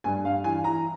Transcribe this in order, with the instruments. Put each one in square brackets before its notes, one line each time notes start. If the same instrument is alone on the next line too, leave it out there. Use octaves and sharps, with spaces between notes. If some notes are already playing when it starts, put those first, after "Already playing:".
[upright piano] G2 G#5
G2 F5
E3 G#5
E3 A#5